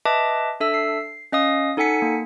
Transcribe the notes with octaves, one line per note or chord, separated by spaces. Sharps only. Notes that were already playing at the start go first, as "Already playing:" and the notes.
B4 D#5 E5 A5 D6
D4 A4 E5 E6
C7
C#4 D#5 F5 D#6
D#4 A4 F#5 G#5 B6 C#7
A#3